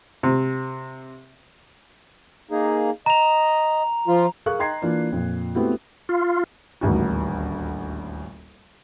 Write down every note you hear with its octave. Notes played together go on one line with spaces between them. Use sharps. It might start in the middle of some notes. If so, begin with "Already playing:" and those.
C3
A#3 D#4 G#4
D#5 A#5 F7
F3 F4
G#4 A#4 F5 C#6 F#6
D#5 G5 A#5 C6 G#6 C7
E3 A#3 D4 F4
F2 A#2
A3 B3 C4 E4 F#4 G4
F4
D#1 A1 D2 F#4